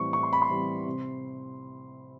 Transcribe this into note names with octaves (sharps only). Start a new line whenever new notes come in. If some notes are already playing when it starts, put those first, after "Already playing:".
Already playing: A2 E3 G3 C4 C#6
A2 C#6
C6
B5
C6
E3 G3 C4
C3